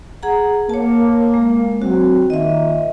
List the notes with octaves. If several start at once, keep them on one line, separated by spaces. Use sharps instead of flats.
G#4 F#5 A#5
A#3 C#5 A5
G#3
F#3 C4 F#4
A#2 D#3 D#5 E5